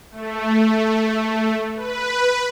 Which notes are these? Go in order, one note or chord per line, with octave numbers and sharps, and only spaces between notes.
A3
B4